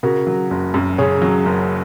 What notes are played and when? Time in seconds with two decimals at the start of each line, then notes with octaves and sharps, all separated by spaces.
0.03 C#3 F#4 A#4
0.27 F#3
0.51 F#1
0.74 F#2
0.98 C#3 G#4 C#5
1.22 F#3
1.45 F#1